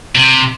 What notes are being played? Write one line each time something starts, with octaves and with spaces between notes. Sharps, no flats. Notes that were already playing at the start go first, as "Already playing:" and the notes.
C3